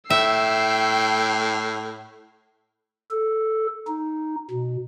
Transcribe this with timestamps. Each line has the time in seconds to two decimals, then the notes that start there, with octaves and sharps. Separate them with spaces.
0.10 A2 E5 G5 E6 C7
3.11 A4
3.88 D#4
4.51 B2